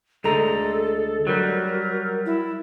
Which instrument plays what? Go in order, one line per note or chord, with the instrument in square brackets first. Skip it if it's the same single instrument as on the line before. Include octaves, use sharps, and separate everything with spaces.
[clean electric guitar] D2 G#3 A#5 [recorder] A4
[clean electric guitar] F#3 G3 [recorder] A#4
[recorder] E4